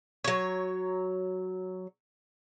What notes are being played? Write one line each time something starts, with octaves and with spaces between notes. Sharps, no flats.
F#3 C#5